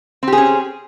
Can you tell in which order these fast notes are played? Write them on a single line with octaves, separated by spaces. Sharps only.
C4 G4 G#4 C#4